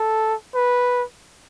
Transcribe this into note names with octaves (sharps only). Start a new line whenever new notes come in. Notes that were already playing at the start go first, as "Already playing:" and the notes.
Already playing: A4
B4